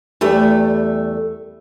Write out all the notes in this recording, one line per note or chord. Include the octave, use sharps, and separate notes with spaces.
E2 G3 A3